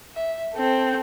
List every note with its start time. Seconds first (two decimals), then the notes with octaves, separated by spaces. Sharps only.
0.15 E5
0.54 C4 A4